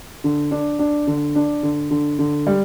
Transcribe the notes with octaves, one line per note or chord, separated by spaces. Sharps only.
D3
D4
D4
D3
D4
D3
D3
D3
G3